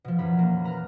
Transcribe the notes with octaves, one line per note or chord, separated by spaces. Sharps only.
B2 F3
F#2 E3 B5
A#3
B4 A#5 B5 F6